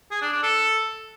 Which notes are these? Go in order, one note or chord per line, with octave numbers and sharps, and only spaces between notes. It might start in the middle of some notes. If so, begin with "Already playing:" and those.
G#4
D4
D4
A4